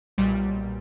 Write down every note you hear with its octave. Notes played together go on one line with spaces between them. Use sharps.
B1 A#2 G3